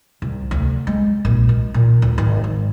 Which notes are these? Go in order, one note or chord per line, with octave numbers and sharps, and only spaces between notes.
C2
D2
G#3
A#1
G#3
A#2
D2
G#1
G#2